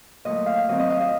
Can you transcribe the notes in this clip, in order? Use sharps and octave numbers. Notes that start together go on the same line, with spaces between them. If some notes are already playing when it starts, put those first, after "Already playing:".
A#2 F#3 A3 D#5
F5
F#2 D#3 F#3 C4 D#5
D#5
F5
D#5